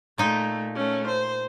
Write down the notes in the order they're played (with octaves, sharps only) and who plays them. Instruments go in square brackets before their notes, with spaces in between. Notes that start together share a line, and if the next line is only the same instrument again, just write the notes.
[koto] A#2 D#4 G5 [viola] A3
[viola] A3 C#4
C5